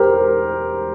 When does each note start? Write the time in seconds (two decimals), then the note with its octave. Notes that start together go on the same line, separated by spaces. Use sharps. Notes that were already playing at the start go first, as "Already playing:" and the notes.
Already playing: G4 A#4 C5